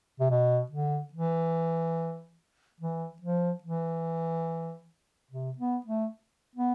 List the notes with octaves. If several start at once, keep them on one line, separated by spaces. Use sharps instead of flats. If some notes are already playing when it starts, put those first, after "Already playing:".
C3
B2
D3
E3
E3
F3
E3
C3
B3
A3
B3